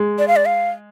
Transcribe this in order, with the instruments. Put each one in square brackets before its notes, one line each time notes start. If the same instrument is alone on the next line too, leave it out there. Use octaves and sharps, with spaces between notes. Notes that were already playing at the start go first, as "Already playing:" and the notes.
Already playing: [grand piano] G#3
[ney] D5
F5
D5
F5